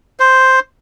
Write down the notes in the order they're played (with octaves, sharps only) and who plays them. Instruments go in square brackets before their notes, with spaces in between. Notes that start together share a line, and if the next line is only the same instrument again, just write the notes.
[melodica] C5